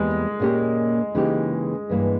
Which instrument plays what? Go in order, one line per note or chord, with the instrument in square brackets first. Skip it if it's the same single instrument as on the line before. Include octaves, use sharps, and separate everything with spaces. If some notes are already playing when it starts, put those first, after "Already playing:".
Already playing: [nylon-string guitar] E2 G3 A#3 [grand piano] G#3
[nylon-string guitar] A#2 A#3 C#4 G4 A#4
C#3 E3 A#3 D#4 G4
G2 E3 A#3